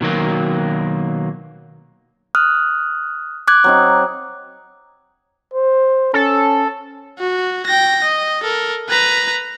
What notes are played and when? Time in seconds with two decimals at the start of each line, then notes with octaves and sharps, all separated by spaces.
0.01 B2 D#3 F#3 A#3
2.35 D#6 F6 F#6
3.48 D6 F#6 G#6
3.64 F#3 C4 D#4
5.54 C5
6.14 C#4 A4
7.19 F#4
7.66 G5 A#6
8.03 D#5
8.43 A4 A#4
8.89 B4 A#5